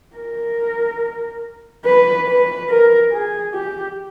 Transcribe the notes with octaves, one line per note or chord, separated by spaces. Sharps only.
A#4
B4
B4
A#4
G#4
G4